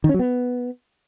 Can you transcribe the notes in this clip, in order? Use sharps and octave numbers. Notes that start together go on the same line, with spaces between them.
D#3
C#4
F#3
B3